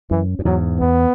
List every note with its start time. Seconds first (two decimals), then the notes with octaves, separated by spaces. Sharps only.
0.11 F#2 E3
0.39 F#2
0.45 E2 G#2 F#3
0.79 E2 B3